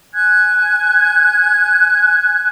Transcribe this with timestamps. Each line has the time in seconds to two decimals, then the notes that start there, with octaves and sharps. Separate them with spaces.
0.14 G#5 F#6 G#6